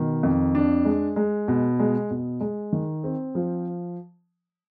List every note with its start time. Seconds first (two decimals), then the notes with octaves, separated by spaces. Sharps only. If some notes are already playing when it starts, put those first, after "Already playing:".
Already playing: B2 D#3
0.23 F2
0.55 D4
0.85 G#3
1.16 G#3
1.48 B2
1.80 G#3
2.10 B2
2.40 G#3
2.73 D#3
3.04 C4
3.35 F3